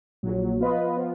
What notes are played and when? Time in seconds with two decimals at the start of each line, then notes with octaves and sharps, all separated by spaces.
0.23 A#1 A#2 F#3
0.59 F3 B3 F4 B4 D#5
0.96 F3 B3 F4